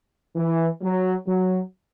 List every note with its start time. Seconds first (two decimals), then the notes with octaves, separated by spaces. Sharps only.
0.36 E3
0.82 F#3
1.27 F#3